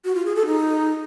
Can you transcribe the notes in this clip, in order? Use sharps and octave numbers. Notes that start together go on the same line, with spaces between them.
F#4
F4
G#4
A4
D#4